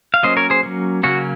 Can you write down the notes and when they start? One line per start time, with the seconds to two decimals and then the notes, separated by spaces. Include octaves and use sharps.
0.14 F5
0.23 F#3 A#3 C#4 C5 D#5
0.37 A#4 C#5
0.50 G#4 C5
0.63 F#3 A#3 C#4
1.03 C#3 F#3 A#3 C#4 F#4